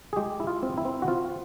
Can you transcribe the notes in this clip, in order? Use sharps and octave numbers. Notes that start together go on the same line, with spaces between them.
G#4
G#3 G4
E4
F4
C4
E4
C4
F#4
C4 F4